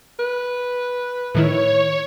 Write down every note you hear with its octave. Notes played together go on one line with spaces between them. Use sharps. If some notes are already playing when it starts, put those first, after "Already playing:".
B4
A2 D#3 E4 C#5